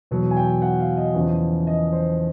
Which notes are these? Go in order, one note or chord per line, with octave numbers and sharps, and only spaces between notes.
E2 B2 F#3
G#5
G5
F#5
F5
D#5
E2 C#3 F3
D#5
C5